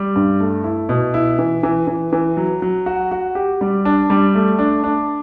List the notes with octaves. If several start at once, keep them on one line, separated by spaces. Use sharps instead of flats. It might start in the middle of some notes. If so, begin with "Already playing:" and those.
Already playing: G3
G2
A3
E4
B2
E4
E3
E3
E3
E3
F#3
F#3
F#4
F#4
G4
G3
D4
G3
A3
D4
D4